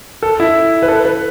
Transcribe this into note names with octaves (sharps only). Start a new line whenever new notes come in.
A4
E4
B4
A4
B4